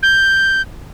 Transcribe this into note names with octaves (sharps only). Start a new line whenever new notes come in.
G6